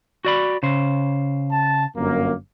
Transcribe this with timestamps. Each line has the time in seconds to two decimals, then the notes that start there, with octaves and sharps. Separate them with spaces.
0.25 F#4 D5 B5
0.63 C#3 C5
1.51 A5
1.96 G1 F#2 A#3